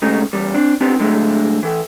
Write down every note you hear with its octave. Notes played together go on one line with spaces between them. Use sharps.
G#2 C#3 G3 A3 D#4
E2 G3
C4 D4
B3 C4 D4 D#4 G4
D3 F#3 G#3 A3
E3 A4